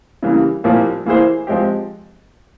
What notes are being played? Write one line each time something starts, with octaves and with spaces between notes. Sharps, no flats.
C#3 E3 G3 A#3
C2 A#2 F3 A#3
E3 A#3 E4 G#4 C5
F3 G#3 C4 G4